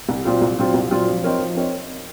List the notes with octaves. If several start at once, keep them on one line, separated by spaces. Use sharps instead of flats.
C2
A#2 F#3 C4 F4
C2
A#2 F#3 C4 F4
C2
A#2 F#3 C4 F4
F3
C4 D#4 A#4 C#5
F3
C4 D#4 A#4 C#5